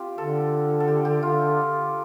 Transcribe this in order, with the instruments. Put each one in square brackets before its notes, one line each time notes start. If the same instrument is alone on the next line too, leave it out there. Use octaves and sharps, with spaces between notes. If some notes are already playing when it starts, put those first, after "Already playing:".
Already playing: [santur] C4 F4 G4
[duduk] D3 [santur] A4
[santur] A4
G4
G4
[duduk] D3 [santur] F4